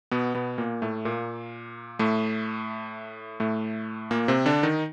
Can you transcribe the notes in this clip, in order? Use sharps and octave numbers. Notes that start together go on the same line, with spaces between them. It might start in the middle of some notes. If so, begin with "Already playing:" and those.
B2 B3
B2 B3
A#2 A#3
A2 A3
A#2 A#3
A2 A3
A2 A3
A#2 A#3
C3 C4
D3 D4
D#3 D#4